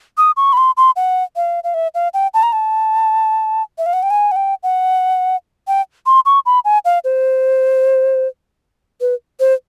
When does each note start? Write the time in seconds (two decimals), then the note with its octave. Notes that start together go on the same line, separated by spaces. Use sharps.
0.18 D#6
0.37 C#6
0.53 B5
0.57 C6
0.77 C6
0.96 F#5
1.36 F5
1.64 F5
1.74 E5
1.95 F5
2.14 G5
2.34 A5
2.43 A#5
2.53 A5
3.78 E5
3.86 F5
3.93 F#5
4.03 G5
4.10 G#5
4.32 F#5
4.36 G5
4.63 F#5
5.68 G5
6.06 C6
6.26 C#6
6.46 B5
6.65 G#5
6.85 F5
7.04 C5
9.01 B4
9.40 C5